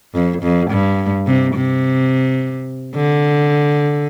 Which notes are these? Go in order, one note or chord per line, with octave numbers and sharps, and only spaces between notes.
F2
F2
G2
C3
C3
D3